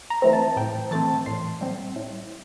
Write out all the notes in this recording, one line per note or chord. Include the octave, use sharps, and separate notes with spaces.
A#5
E3 A3 C4
A5
A2 G5
E3 A3 C4 A5
A2 C6
G3 C4
A2